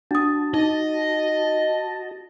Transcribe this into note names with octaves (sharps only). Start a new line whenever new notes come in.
D4 F#4 A5 D#6
D#4 D#5